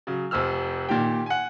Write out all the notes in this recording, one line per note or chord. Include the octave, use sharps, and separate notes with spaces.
C#3 F#3
F1 F2 C5 E6 F6
A#2 D#3 G4 G5
F#5 G#5